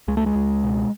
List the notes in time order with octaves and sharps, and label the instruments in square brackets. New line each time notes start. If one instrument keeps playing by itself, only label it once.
[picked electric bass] C#2 G#3
A3
G#3
C#2
B2